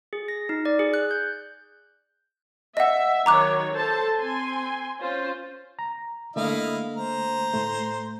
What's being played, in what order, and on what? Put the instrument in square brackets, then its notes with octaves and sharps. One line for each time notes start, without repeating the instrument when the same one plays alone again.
[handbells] G#4
A#6
D#4
D5
G#4
F#6
G6
[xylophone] D#5 F#5 [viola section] E5
[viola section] D#3 F#3 C#5 [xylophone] A#5 D6 F#6
[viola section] A4 C5 A5
C4 G#5 C6
C#4 F4 C5
[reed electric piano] A#5
[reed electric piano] D3 A3 A#3 [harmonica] E4 D#5 F5
[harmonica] C5 A#5
[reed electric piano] A2 A3